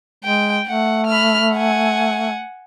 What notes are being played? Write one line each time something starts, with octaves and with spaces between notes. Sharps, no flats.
G#3 G5
A3 F#5
B5 F6
F#5 G#5